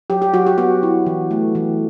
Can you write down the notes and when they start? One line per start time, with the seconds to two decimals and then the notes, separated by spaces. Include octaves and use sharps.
0.10 F#3 G4
0.22 G4
0.34 F#3 F#4
0.46 G4
0.58 B3 F#4
0.83 E4
1.06 E3
1.31 A3
1.55 E3